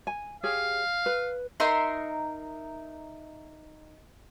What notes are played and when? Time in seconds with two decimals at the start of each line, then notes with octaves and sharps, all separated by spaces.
0.07 G#5
0.44 G4 G#4 C#5 F5
1.06 B4
1.60 D#4 A#4 E5 C6